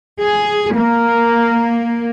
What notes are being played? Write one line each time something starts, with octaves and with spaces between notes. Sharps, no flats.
G#4
A#3 A#4